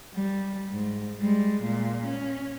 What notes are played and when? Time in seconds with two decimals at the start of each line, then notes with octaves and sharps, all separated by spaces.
0.14 G3
0.71 G#2
1.20 G3 G#3
1.62 A#2 G#3
2.05 C#4